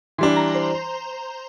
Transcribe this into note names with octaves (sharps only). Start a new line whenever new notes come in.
E3 G3 D4 C6
A#5
C5